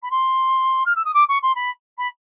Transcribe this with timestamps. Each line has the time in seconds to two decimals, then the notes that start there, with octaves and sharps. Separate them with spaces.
0.02 B5
0.10 C6
0.86 F6
0.95 E6
1.04 D#6
1.14 D6
1.28 C#6
1.42 C6
1.55 B5
1.97 B5